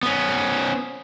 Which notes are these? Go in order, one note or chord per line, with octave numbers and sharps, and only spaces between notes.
B3 C#4